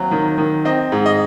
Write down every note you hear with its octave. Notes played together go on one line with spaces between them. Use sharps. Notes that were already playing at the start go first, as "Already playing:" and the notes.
Already playing: D#2 F#3 C4 F5
D#3
D#3
C4 D#5
G#2
D#5